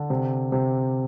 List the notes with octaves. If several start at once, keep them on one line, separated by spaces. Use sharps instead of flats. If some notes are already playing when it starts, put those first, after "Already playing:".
Already playing: D3
C3
C3